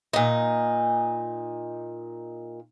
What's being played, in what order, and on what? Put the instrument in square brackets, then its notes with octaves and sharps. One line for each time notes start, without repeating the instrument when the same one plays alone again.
[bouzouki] A#2 D#4